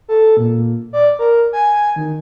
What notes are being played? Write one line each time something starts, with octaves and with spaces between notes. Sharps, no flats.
A4
A#2
D5
A#4
G#5
D#3